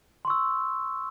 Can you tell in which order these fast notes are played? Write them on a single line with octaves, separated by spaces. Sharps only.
C6 C#6 E6